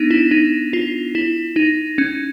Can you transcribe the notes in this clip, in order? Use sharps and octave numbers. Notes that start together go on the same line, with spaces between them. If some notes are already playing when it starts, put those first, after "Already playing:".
Already playing: B3 D4 D#4
E4
D#4
F4
E4
D#4
C#4